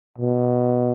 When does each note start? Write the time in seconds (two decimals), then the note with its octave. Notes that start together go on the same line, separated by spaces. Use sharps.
0.18 B2